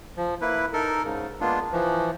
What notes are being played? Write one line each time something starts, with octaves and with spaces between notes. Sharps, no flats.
F3
A#3 E4 B4
D#4 A4 A#4
G#2 C#3
G#3 A#3 B3 D4 F4
E3 F3